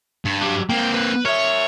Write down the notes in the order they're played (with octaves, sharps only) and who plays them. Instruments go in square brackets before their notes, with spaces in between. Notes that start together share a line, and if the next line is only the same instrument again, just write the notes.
[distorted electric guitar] G2
[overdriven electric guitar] F#3 G4
[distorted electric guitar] A#3 C4 [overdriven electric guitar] G5
[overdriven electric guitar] B4
[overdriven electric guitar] A#4 E5 [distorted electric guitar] C#5